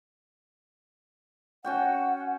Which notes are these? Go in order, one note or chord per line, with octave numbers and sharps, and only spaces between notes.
C#4 F#4 F#5 G5